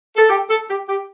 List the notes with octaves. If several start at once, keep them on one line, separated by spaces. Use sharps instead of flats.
A4
G4
A4
G4
G4